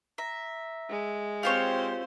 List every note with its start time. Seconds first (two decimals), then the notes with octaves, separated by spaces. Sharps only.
0.18 E5 A#5 A#6
0.90 G#3
1.43 C4 F4 G4 C5 C#5 F5